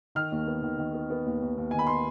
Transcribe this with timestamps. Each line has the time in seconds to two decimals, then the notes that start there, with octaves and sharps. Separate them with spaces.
0.15 D#3 F6
0.32 D#2
0.46 B3
0.62 D#3
0.78 D#3
0.93 B3
1.10 B3
1.26 D#2
1.42 D#2
1.57 D#2
1.71 D#3 G#5
1.79 B5
1.87 B3 C6